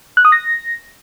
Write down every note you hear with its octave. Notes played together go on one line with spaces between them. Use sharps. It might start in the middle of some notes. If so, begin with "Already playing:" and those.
F#6
D#6
A#6